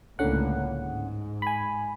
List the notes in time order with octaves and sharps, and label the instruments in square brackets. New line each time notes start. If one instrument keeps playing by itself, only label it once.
[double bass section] C#2 A2 A#3 [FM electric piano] D3 C#4 F#5
[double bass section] G#2
[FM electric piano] G#5 B5